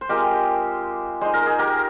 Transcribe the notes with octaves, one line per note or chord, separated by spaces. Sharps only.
C5
G#3 C4 F4 G4 A#4
G#3 D#4 C5
A#4
G#4
G4 A#4